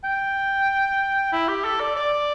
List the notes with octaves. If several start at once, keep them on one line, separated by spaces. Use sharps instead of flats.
G5
E4
G4
A4
D5
D5